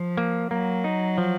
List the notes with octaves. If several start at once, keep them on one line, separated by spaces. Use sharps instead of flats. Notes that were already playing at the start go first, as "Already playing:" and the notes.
Already playing: F3
A#3
F#3 A#3
D#4
F3